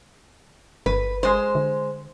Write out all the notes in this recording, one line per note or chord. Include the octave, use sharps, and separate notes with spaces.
G1 B4
G#3 C5
D3